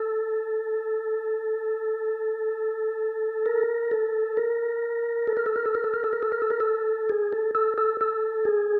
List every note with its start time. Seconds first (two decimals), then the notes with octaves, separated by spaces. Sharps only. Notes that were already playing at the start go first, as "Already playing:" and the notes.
Already playing: A4
3.46 A#4
3.91 A4
4.37 A#4
5.27 A4
5.37 A#4
5.46 A4
5.56 A#4
5.66 A4
5.75 A#4
5.84 A4
5.94 A#4
6.04 A4
6.13 A#4
6.23 A4
6.32 A#4
6.42 A4
6.50 A#4
6.60 A4
7.09 G#4
7.33 A4
7.55 A4
7.78 A4
8.01 A4
8.45 G#4